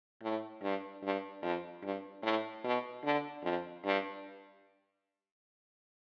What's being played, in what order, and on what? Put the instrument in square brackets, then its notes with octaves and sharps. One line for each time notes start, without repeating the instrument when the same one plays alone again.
[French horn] A2
G2
G2
F2
G2
A2
B2
D3
F2
G2